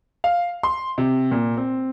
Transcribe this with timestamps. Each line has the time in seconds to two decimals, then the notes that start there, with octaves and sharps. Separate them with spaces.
0.24 F5
0.63 C6
0.98 C3
1.32 A#2
1.57 C4